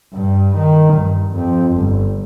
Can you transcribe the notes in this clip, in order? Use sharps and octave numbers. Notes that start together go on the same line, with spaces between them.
G2
D#3
G2
F2
G1